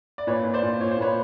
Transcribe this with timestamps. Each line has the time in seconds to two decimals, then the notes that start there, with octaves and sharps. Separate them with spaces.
0.18 D5
0.27 A#2 B4 C#5
0.45 A#2
0.54 C5 D5
0.63 A#2
0.81 A#2 C#5
0.91 C5
0.97 A#2 B4 C#5